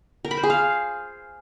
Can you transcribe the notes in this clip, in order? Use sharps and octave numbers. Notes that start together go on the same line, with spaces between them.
A#4
B5
C5
G#4
F5